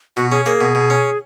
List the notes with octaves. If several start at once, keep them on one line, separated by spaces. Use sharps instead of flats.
B2 F#4
C#4 G#4
A#3 G#4
B2
B2
C#4